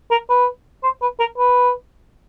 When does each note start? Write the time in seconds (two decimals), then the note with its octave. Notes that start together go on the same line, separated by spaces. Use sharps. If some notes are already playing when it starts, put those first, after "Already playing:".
0.11 A#4
0.29 B4
0.83 C5
1.02 B4
1.20 A#4
1.38 B4